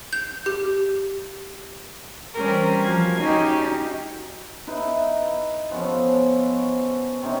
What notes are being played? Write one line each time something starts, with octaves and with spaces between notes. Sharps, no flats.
G6
G4
E3 G3 C4 C#4 G4 A#4
F3 F#4 F5 G#6
C#4 D#4 F#4 G4
D#4 E4 B4
F3 B3 C#4 A4
F#4
C3 C#4 D#4